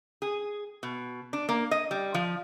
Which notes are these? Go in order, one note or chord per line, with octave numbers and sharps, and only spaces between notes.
G#4
B2
D4
A#3
D#5
G3
F3